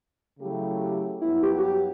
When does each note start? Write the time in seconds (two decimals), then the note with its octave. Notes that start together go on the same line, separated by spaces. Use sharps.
0.39 C#3 F#3 A3 E4 G4
1.21 G2 F#3 B3 E4
1.43 G4
1.58 F#4
1.63 G4